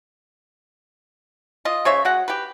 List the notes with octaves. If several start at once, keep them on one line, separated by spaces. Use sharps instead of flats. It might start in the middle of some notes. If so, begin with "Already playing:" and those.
F4 D#5
C#3 C5 C#5 E5
G#3 F#4 F#5
G4 B4